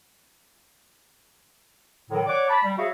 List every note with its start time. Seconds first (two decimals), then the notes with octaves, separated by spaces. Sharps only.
2.10 A2 D3 D#3 F#3
2.27 C#5 D5 F#5 D6
2.49 A5 B5
2.63 G3
2.78 F#4 G#4 C#5 E5 F5